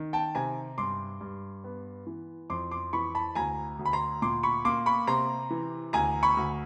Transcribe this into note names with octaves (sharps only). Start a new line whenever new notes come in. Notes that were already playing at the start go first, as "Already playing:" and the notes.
Already playing: D#3
G5 A5
C3 G#5 A#5
G2 C6 D6
G2
B3
E3
F2 C6 D6
C6 D6
E3 B5 C#6
A5 B5
D2 G#5 A#5
D2
B5
A#5 C6
A#2 C6 D6
B5 C#6
A#3 C6 D6
B5 C#6
C3 A#5 C6
E3
D2 G#5 A#5
B5 C#6
D2